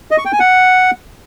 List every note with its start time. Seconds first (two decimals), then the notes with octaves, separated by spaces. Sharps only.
0.11 D#5
0.18 C#6
0.25 G5
0.33 G#5
0.40 F#5